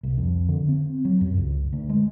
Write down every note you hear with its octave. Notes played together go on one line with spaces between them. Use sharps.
C2
F2
D3
C4
F#3
F#2
C#2
D2
G#3